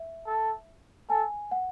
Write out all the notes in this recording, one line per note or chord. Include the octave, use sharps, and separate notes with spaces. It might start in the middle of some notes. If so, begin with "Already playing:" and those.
Already playing: E5
A4
A4 G#5
F#5